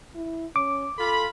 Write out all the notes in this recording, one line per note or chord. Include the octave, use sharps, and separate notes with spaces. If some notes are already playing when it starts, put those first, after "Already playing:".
E4
C#4 D6
F4 A4 B5